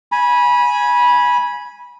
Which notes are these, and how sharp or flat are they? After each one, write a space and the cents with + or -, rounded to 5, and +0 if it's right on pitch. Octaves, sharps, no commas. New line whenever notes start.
G#5 +0 B5 -20